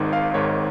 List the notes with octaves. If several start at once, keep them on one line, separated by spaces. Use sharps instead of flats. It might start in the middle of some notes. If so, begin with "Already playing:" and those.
Already playing: G#1 G#2 D#3
F5
G#1 G#2 D#3 C#5